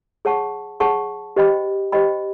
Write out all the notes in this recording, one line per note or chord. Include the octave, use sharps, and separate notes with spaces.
G#4 C#5 F#5 A5 C#6
G#4 C#5 F#5 A5 C#6
G4 C5 D#5 G5 B5
G4 C5 D#5 G5 B5